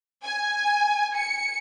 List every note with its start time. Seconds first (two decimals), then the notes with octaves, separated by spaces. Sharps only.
0.24 G#5
1.15 C#7